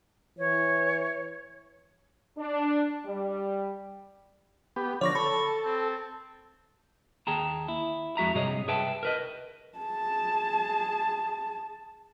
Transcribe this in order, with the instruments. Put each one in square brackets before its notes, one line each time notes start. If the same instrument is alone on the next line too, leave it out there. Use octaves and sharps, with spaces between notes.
[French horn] E3 [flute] C#5
[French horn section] D4
G3
[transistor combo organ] B3 G4
[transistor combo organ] D3 F3 [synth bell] C#5 C#6 A#6 [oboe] D5
[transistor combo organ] A4 [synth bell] B5 [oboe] C#6
[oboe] C4
[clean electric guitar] D#2 G#4 G5 A5 A#5
E4
F2 G#3 F#4 E5 A#5
G2 C3 G#4 C#5 D#5
G#4 B4 E5 G5 A5
A#4 B4 D#5
[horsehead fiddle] G#4 A5